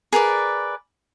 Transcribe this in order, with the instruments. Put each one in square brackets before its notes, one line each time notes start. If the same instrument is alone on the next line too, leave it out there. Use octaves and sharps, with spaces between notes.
[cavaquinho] G#4 A#4 B4 D5